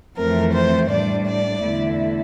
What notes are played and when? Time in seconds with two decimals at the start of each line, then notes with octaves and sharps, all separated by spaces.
0.16 F2 E3 A3 C4 A#4
0.53 C5
0.89 A2 G3 D4 D5
1.25 D5
1.62 E2 D3 A3 E4